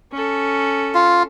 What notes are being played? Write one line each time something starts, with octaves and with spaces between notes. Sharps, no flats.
C#4 A4
F4